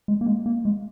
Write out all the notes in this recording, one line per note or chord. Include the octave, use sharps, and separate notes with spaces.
G#3
A#3
G#3
A#3
G#3